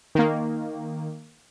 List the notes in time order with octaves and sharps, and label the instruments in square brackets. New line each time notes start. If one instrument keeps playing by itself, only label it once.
[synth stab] D#3 A#3